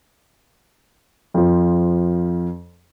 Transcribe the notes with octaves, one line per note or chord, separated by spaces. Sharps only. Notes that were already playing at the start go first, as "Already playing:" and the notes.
F2 F3